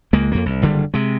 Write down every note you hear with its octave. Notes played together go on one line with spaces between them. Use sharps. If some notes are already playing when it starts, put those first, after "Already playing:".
C#2 G#3 A#3
F2 A#3
C2
F#1 D3 G3
C3 G#3